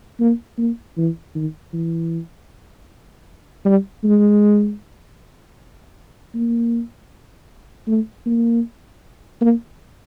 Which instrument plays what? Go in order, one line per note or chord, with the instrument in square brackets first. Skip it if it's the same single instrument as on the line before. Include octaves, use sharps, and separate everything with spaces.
[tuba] A#3
A#3
E3
D#3
E3
G3
G#3
A#3
A3
A#3
A#3